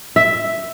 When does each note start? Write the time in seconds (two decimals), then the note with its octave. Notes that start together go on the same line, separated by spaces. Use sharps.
0.16 E5